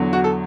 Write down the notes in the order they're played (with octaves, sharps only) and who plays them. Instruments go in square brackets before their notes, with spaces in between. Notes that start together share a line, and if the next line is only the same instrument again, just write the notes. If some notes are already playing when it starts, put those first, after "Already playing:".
Already playing: [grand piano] E2 D3 F#3
F#4
A4